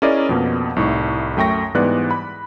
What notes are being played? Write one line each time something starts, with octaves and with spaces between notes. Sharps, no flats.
C#4 E4 G#4 A#4 D5 D#5
F2 B2 A#3
C2 A2 D#4 C#6
F#2 A3 G5 C#6 A#6
G#2 E3 G3 B3 D5 F#6
B5